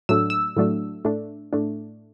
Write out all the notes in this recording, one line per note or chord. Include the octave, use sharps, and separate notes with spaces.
A2 F#3 A3 D4 E6
E6
A2 F#3 A3 D4
A2 A3 D4
A2 A3 D4